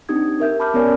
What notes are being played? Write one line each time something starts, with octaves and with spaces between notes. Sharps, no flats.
C4 D4 D#4 G4 D#6 G#6
G4 A#4 E5 G6
A5 B5 D6 F6 G6
B3 C#4 A#4 C#5 D5 G#5